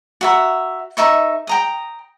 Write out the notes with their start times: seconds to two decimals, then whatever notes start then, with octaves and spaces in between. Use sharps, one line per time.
0.21 F#4 E5 A#5
0.97 D#4 A#4 E5 C#6
1.47 G5 A#5 D#6